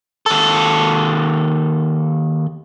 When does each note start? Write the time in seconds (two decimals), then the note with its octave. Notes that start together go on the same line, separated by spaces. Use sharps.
0.26 D#2 A4